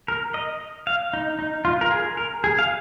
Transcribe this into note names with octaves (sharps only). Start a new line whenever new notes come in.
A#4
D#5
F5
D#4
D#4
F4
A#4
G#4
A#4
G#4
F5